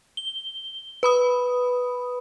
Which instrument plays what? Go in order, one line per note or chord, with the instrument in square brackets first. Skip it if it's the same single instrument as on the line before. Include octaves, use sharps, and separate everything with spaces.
[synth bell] G7
B4 B5 D#6